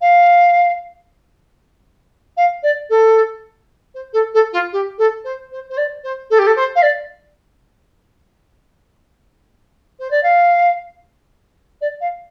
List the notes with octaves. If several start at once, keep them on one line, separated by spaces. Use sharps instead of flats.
F5
F5
D5
A4
C5
A4
A4
F4
G4
A4
C5
C5
C5
D5
C5
A4
G4
A4
C5
F5
D5
C5
D5
F5
D5
F5